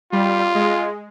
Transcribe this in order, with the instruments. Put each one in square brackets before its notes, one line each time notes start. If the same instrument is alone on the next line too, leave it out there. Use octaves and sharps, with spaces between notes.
[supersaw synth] G3 [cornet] F4
[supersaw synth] G#3